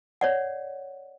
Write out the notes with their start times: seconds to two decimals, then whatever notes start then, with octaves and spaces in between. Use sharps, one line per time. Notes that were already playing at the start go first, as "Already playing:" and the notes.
0.21 C#5 D5 F#5